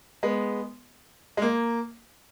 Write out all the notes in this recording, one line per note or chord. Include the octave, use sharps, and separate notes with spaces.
G#3 B3
G#3
A#3